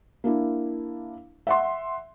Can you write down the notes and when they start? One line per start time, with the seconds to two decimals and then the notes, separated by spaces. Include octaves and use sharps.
0.24 A#3 D4 E4
1.47 E5 F#5 C6